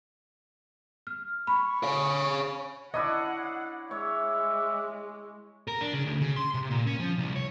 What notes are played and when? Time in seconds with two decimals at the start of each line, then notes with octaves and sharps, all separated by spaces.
1.07 F6
1.47 B5 C#6
1.83 C#5 F5
2.94 D4 E4 C#5 D#5 F#5
3.91 G#3 C#5 E5 D6
5.67 A#4
5.81 D4
5.93 C#3
6.05 D2
6.21 C#3
6.36 C6
6.54 C3
6.71 A#2
6.87 C#4
6.99 F3
7.18 C2
7.36 C#5